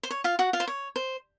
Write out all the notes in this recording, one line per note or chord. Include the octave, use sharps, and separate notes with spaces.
C5
C#5
F4 F5
F#4 F#5
F4 F5
C5
C#5
C5